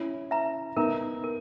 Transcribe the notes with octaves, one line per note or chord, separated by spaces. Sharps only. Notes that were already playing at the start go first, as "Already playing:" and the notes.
Already playing: C#4 E4
B4 E5 A#5
B3 D#4 A#4 E5 A#5
A#4